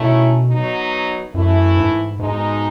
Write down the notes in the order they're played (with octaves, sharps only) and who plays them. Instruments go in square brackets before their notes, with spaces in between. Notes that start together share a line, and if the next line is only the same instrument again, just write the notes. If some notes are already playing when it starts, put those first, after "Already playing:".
Already playing: [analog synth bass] B2 [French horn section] D#3 A3 C#4 E4
[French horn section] F#3 B3 D#4
[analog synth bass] F#2 [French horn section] E3 A3 E4
[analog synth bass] G#2
[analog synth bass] G#2 [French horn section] B2 G#3 D#4